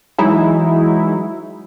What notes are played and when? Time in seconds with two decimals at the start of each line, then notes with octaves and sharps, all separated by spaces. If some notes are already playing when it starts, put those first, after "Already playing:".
0.18 E3 F#3 G#3 D#4 E4